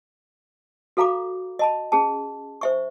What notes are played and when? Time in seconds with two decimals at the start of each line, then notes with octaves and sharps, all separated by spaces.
0.97 F#4 A4 F5 A#5 B5 D6
1.59 D#5 A5 B5
1.92 C#4 G#4 A5
2.61 C5 E5 C#6